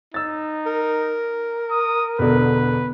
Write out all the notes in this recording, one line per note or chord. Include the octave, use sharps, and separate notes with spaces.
D#4 E6 A6
A#4
D#6
E1 B2 D3 B4